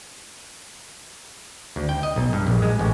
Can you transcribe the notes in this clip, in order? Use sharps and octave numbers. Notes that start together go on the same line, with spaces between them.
D2
G5
D#5
B1
G2
A#1
G#3
A1